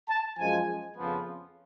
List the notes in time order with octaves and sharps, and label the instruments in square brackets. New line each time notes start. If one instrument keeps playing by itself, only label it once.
[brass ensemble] A5
F#2 F3 G#3 G#5
F2 C#3 F3 B3